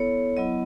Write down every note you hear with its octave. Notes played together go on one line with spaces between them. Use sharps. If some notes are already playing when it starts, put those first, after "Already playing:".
Already playing: B3 E4 A4 C#5
F#3 B3 E4 D#5